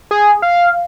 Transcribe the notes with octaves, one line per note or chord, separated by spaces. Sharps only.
G#4
F5